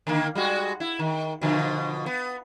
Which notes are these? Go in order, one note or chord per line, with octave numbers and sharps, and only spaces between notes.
D3 D#3 A#3
G3 G#3 F#4
E4
D#3
B2 D3 F3
B3